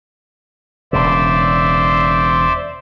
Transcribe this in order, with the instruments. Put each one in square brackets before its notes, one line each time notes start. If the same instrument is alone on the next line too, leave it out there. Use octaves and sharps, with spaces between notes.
[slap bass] E1 C#3 [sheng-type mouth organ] C5 D5 E5